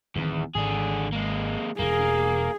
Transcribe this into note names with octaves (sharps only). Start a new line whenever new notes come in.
D1 E2 D#3 C4
G#1 G#2 D3 G#4
G#3 A#3
E1 E2 A#3 G#4